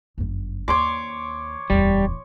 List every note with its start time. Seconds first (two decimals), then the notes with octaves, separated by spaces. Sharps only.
0.18 G1 F#2
0.68 D#2 C#5 C6 D6
1.70 D1 E2 G3